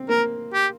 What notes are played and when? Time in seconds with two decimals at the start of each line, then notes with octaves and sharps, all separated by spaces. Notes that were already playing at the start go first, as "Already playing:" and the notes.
Already playing: C4
0.09 A#3 A#4
0.54 G4